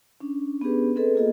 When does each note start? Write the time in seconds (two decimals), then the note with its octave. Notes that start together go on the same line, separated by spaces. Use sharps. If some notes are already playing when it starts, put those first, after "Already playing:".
0.20 C#4 D4
0.61 B3 C#4 D4 G4 G#4 B4
0.96 C4 G#4 A4 B4 D#5
1.15 A#3 B3 F4 G#4 A4 D#5